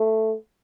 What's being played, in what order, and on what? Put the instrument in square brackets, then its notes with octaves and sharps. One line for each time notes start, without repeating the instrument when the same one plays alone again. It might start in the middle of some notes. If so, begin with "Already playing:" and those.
Already playing: [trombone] A3